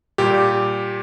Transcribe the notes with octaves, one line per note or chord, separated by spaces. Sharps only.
A#2 G3 G4